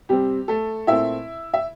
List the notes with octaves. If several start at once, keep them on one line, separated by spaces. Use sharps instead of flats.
C3 G3 C4 G4
A3 A4
A#2 A3 C4 E4 E5
E5